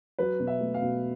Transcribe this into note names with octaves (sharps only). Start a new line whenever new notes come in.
F#3 B4
B2
E5
A3
F5
B2